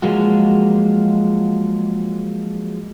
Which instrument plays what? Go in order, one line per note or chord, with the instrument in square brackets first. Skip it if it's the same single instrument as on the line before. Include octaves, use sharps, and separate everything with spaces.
[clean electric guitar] F3 F#3 G#3 A#3 F4 F#4